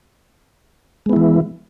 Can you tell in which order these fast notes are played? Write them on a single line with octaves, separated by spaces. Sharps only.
G#3 B3 E4 E3